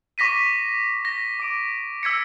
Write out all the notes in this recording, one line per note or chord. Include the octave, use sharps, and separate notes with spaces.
C#6 D6 A#6 B6 D#7
A#6
D6 D7
E6 G#6 B6 C#7